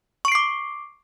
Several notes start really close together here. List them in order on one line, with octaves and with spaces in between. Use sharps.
C#6 D7 C7 D6